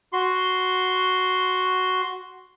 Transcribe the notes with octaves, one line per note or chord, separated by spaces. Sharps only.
F#4 C6